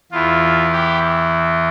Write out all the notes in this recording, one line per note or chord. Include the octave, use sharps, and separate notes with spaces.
E2 E3 F4
G4